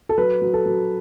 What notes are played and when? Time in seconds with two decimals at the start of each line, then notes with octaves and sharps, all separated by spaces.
0.09 A4
0.18 F#3 B4
0.42 F#3
0.54 A4
0.66 F#3